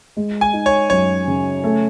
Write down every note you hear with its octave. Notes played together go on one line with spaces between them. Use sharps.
G#3
G#5
D#4
C#5
F#2 C#5
C#3
A3